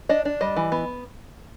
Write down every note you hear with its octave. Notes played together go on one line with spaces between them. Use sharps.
D4 D#5
D4
G3 D#5
E3
B3